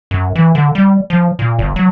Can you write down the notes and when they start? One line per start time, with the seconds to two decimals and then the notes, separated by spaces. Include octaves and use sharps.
0.11 F#2
0.35 E3
0.55 D3
0.75 G3
1.10 F3
1.39 A#2
1.59 G1
1.76 F#3